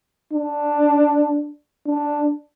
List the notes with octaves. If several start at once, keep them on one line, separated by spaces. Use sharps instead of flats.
D4
D4